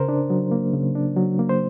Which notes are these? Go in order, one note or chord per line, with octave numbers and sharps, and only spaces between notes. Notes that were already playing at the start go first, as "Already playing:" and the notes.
Already playing: C#3 A#4 C5
D4
F#3
A#3
C#3
D4
F#3
A#3
C5